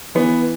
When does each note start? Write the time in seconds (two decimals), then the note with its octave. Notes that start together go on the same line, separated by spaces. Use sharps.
0.15 E3 B3